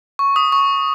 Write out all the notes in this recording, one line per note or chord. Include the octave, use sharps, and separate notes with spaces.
C#6
D#6
C#6